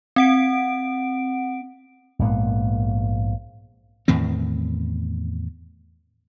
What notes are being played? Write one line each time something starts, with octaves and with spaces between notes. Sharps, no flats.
C4 F#5 D7
A#1 G#2 A#3 B3
E2 A2 D#3 C4